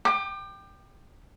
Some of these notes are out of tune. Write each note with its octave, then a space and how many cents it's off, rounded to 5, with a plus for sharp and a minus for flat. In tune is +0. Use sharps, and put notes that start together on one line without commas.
G5 +0 D6 +30